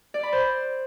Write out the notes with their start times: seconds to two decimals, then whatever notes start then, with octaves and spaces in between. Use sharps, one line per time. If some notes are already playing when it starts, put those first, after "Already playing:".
0.14 D5
0.23 B5
0.32 C5